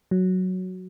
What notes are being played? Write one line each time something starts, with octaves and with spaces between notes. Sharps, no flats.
F#3